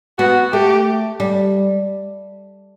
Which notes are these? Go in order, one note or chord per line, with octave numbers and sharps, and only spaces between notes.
B3 F#4
A3 G4
G3